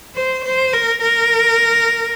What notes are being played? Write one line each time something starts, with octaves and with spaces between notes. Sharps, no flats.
C5
C5
A#4
A#4